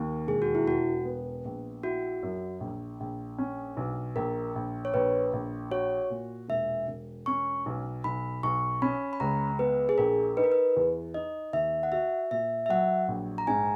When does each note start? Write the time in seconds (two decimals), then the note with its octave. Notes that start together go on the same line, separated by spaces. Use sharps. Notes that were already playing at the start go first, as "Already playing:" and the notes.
Already playing: D#2 A#3
0.28 E1 G#4
0.42 F#4
0.55 E4
0.67 E1 F#4
1.05 B3
1.45 A#1
1.83 E4 F#4
2.23 F#2
2.60 A#1
3.00 A#1
3.39 C#4
3.77 B1
4.16 A#1 A#4
4.56 A#1
4.85 C#5
4.94 A#1 B4
5.33 A#1
5.71 F#4 C#5
6.10 A#2
6.48 E1 E5
6.88 E1
7.26 C#4 C#6
7.66 B1
8.04 B1 B5
8.43 B1 C#6
8.82 C#4 B5
9.13 B5
9.20 C#2 A#5
9.59 B3 B4
9.89 G#4
9.98 A#1 A#4
10.37 D#4 B4
10.44 A#4
10.52 B4
10.76 E2
11.14 D#4 D#5
11.53 D#2 E5
11.83 F#5
11.92 F#4 E5
12.31 A#2 E5
12.66 E5
12.69 F#3 F#5
13.08 A#1
13.38 A#5
13.47 G#2 G#5